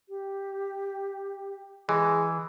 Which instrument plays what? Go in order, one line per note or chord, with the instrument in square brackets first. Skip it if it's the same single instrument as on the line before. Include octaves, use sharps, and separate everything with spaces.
[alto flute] G4
[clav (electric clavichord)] E3 [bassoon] G#3